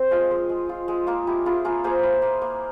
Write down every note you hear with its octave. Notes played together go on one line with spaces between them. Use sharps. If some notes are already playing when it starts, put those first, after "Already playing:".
Already playing: C4 C5
G#3 F4
G#3
G#3
F4
G#3
A#3 F4
E4 G4
E4 F4 G#4
A#3 F4 G#4
A#3 G#4 C5
E4
A#3
A#3